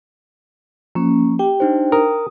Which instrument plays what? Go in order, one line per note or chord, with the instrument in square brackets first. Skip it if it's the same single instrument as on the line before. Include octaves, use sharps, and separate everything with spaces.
[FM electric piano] F3 [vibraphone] A#3 C#4
[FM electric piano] G4 [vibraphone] G5
[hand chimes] D4 D#4 C5
[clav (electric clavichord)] A#4 [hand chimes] D#6